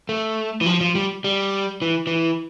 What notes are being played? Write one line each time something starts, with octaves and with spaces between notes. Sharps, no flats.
A3
E3
F3
F3
G3
G3
E3
E3